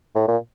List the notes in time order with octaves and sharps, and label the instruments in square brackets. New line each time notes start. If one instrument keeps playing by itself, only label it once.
[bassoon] A2
A#2